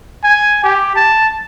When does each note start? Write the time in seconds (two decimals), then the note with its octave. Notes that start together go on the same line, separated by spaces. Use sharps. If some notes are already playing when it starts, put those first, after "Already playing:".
0.24 G#5
0.64 G4
0.96 A5